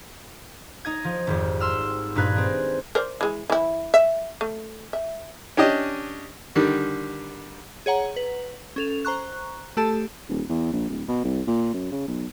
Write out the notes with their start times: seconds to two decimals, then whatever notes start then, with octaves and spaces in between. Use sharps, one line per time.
0.85 D#4 D#5 G#6
1.04 F3
1.27 G#1 F2 G3
1.60 C6 E6 F6
2.15 G2 A#2 D#4 B4 F#6 G#6
2.36 G#3 C4
2.95 A#4 C5 D5
3.21 E3 G#3
3.50 E3 E4
3.94 E5
4.41 A3
4.93 E5
5.57 C#4 D4 G4 D#5
6.56 D3 D#3 G3
7.86 G#4 C#5 F#5 A#5
8.16 B4
8.76 C#4 A4 F7
9.05 C5 A#5 C#6 F#6
9.77 A3 G4 A4 A5
10.29 D#1
10.50 E2
10.73 A#1
10.89 D1
11.08 B2
11.24 C2
11.47 A#2
11.74 F#2
11.92 C#3
12.08 B1